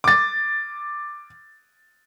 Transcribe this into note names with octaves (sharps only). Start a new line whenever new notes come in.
D6 A6